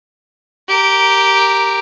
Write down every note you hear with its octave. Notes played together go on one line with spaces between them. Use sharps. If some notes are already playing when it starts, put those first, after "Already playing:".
G4 A#4